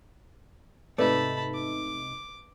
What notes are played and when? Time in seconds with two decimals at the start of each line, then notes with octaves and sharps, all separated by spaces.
0.98 G#2 C3 A3 D#4 B4 D5 A5 B5
1.54 D6